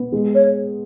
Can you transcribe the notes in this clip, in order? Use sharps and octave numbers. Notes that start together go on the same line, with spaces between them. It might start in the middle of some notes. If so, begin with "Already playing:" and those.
Already playing: B3
G#3
C#5